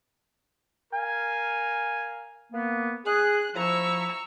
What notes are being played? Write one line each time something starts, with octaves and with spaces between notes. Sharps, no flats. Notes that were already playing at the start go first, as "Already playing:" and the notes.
A#4 F5 G#5
A#3 B3
G#4 F#6
F3 E4 A#5 C#6 E6